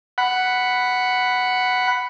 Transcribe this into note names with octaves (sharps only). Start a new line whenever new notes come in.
F#5 B5